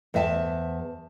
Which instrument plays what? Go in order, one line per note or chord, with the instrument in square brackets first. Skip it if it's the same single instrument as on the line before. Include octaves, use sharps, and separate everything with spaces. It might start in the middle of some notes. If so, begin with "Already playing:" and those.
[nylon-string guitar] E2 C5 E5 G#5 A5